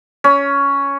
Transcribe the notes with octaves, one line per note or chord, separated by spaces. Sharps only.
C#4